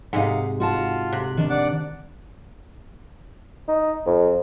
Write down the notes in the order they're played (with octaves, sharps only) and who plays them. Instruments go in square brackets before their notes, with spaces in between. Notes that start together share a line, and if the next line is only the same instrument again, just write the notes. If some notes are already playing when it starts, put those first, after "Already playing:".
[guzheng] G#2 C3 D#4 [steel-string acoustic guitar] F5 F#5
[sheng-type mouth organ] F4 [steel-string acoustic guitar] F#4 F#5 A5
[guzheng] C3 [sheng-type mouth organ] F#6
[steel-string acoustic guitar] D#3 D4
[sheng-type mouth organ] D5 F#5 D6
[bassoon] D#4
F2